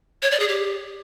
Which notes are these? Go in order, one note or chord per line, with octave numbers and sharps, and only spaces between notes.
C#5
D5
G#4
G4